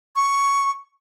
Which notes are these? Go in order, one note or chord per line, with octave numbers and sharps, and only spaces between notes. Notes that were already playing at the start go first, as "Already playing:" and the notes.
C#6